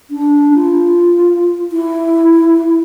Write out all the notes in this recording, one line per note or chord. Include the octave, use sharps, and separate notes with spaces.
D4
F4
E4